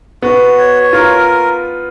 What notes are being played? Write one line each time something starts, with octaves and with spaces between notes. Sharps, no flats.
B3 F#4
C#5
F4 A#4